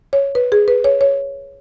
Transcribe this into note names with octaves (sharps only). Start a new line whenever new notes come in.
C#5
B4
G#4
B4
C#5
C#5